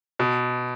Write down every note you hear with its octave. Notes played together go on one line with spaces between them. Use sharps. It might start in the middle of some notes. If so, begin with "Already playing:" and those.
B2